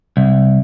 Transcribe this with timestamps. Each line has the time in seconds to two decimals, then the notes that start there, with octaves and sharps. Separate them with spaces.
0.17 C2